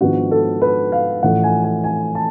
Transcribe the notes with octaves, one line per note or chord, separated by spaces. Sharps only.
G#1 G#2 F3 B3 D4 F#4
A4
B4
F5
A1 A2 F3 F#5
G#5
G#5
G#5
A5